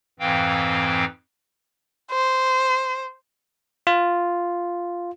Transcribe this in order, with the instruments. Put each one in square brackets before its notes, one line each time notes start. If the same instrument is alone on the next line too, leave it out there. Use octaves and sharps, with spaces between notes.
[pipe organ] F2 G#2 E3 C4 F5 G5
[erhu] C5
[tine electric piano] F4